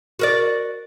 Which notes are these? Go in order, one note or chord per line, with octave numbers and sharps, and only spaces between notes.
F#4 A#4 D5